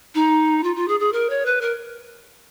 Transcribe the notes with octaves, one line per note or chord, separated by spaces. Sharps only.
D#4
F4
F4
G#4
G#4
A#4
C#5
B4
A#4